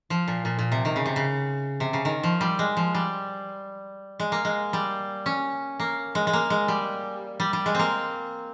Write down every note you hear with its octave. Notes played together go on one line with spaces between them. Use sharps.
F3
A#2
A#2
A#2
C3
D#3
C#3
C3
C#3
C3
C#3
D#3
F3
G3
G#3
F3
G3
G#3
A#3
G#3
G3
C#4
A#3
G#3
G#3
A#3
G#3
G3
G3
G3
G#3
A#3 C4